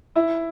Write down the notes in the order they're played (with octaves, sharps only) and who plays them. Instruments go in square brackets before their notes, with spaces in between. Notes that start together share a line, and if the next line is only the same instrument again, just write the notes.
[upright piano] E4 E5